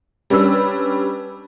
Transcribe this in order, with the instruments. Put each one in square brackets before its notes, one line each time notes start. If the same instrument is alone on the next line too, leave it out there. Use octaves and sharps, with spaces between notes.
[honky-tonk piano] G3 C#4 D4 B4 E6